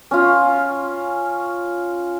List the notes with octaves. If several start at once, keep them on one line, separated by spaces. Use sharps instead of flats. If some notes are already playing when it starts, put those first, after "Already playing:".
C#4 F4